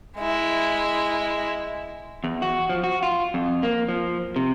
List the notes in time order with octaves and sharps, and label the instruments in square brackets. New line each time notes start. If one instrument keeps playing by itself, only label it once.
[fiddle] G#3 E4
[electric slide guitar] E2
F#4
F3
F#4
F4
F2
A#3
F3
C3